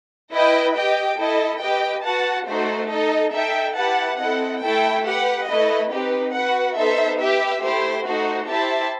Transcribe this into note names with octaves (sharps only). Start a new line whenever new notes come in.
E4 B4 D#5 G5
G4 D#5 G5
E4 A4 D#5
G4 B4 D#5 G5
F#4 B4 F#5 A5
A3 D#4 F#4 C5
D#4 A4 D#5
D#4 A4 E5 G5
E4 G4 B4 F#5 A5
C4 E4 A4 D#5 F#5
A3 E4 A4 E5 G5
G4 B4 F#5
A3 E4 B4 D#5
C4 D#4 G4 B4
F#4 B4 F#5
B3 D#4 A4 C5 E5
G4 B4 E5
A3 E4 G4 C5
A3 D#4 F#4 C5
E4 G4 C5 E5 A5